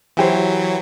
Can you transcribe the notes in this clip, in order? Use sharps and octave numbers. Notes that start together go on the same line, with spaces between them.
E3 F#3 E4 G4 C5